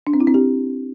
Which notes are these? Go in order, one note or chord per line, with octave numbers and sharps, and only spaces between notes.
D4
C4
E4
C4
G4